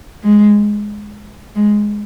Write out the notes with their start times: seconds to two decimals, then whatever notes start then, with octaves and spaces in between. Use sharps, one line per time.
0.24 G#3
1.56 G#3